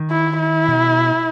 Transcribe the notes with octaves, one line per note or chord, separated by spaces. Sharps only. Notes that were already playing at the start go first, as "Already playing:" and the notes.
Already playing: D#3
E4
E4
B2